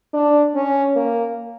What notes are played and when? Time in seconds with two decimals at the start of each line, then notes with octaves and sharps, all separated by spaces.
0.14 D4
0.55 C#4
0.95 A#3